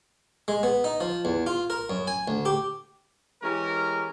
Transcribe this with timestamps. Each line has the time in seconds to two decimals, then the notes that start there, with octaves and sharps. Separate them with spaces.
0.48 G#3
0.63 B3
0.84 D#4
1.01 F3
1.25 E2
1.47 F4
1.70 A#4
1.90 F#2
2.07 G#5
2.28 D2
2.45 G4
3.42 E3 G#3 C#4 G4 A#4